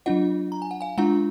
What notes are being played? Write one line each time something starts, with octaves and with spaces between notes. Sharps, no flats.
F#3 D4 F4 D#5 F#5
A#5
G#5
F#5
F5 G#5
G#3 D4 F4 F#5 A#5